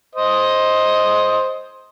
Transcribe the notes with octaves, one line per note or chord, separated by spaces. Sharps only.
C5 D#5 D#6